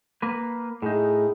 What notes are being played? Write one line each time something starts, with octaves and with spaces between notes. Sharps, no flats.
A#3 B4
A2 D#4 G#4